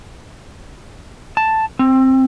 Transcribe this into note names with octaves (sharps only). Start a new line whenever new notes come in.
A5
C4